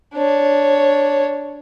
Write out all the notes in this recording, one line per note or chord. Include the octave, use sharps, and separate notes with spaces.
D4 C#5